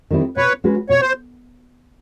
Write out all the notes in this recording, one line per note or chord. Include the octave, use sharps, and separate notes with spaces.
D#3 G3 C4 E4
B2 B4 C#5
G#3 C#4 F#4 B4
B2 C#5
C5